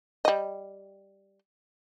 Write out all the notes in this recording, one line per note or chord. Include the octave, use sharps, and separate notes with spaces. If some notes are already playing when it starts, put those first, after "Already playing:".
G3 D#5